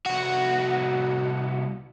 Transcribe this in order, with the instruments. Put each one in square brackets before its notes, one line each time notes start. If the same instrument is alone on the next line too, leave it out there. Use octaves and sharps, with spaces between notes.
[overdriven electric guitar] C2 F#4